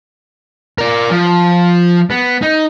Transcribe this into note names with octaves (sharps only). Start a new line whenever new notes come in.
A#4 D5
F3
B3
D#4